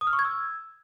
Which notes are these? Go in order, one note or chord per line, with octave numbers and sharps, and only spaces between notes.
D#6
F6
C#6
G#6
E6